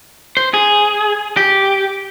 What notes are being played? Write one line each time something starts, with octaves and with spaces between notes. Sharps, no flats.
C5
G#4
G4